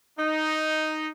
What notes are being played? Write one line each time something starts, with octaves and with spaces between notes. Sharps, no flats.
D#4